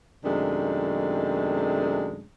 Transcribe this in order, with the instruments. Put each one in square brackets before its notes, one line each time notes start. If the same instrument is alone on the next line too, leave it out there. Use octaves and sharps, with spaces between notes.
[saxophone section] F#2 C3 D#3 G#3 A3 D4